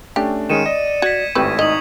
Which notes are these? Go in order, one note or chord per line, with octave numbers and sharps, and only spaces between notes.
A3 C#4 D4 G4
D#3 G#3 C#4 C#7 D#7 E7
D5 D#5
F#4 G#6 B6
G#1 A2 C4 G4 B4 C#6
D#4 D#5 D#6 F#7